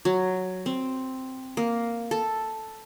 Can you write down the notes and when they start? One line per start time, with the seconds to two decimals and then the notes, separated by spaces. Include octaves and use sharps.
0.05 F#3
0.66 C4
1.57 A#3
2.11 A4